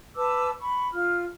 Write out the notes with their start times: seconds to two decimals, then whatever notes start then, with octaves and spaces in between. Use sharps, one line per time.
0.16 B4 A5 D6 E6
0.60 B5 C#6
0.93 F4 F6